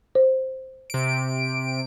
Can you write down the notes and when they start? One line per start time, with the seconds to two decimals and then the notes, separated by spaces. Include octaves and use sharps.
0.15 C5
0.90 C3 D7